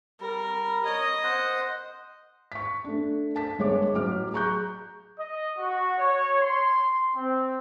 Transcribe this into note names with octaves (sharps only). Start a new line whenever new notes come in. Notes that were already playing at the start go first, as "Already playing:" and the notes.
G3 A#4
C#5 D#5 D#6
C5 F#5
C#6 B6
A3 D4
A#4 A5 B6
G1 G#3 C#5 D6
A1 A2 F#3 D6 F6
G#4 A#5 C#6 F#6 G6
D#5
F#4
C#5
C6
C4